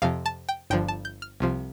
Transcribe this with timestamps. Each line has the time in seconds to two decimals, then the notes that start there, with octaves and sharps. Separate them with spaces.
0.02 F2 C3 F3 F5
0.26 A5
0.49 G5
0.70 G1 G2 D3 F3 G5
0.88 A5
1.05 G6
1.22 F6
1.40 C2 C3 F3